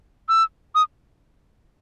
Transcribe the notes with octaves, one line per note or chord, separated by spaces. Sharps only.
E6
D#6